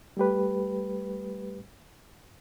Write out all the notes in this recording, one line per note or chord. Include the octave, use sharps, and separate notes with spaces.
G3 A3 G4 B4